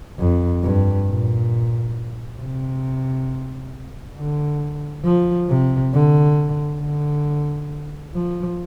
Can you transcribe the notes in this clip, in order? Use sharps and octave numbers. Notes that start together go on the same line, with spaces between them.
F2
G2
A#2
C3
D3
F3
C3
D3
D3
F3